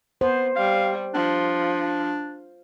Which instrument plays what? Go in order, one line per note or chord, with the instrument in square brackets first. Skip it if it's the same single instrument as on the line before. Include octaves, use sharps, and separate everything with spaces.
[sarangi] B3 [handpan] C5
[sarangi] G3 [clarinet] F5
[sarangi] F3 [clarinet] D4